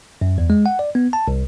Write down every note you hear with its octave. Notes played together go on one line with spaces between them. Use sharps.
F#2
E2
G#3
F#5
D5
B3
A5
C2